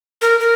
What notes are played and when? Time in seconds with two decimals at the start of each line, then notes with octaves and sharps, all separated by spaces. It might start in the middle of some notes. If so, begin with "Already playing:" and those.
0.22 A#4
0.40 A#4